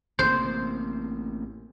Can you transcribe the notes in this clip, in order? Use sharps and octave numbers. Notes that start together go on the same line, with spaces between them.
A1 C3 A#3 C5